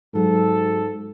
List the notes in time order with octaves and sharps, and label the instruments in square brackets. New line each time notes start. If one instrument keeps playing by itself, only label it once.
[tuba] G#2 [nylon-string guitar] F#3 [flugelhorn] A4